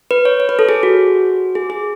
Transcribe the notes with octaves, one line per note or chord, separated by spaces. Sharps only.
B4
C#5
C#5
B4
A4
G#4
F#4
G#4
G#4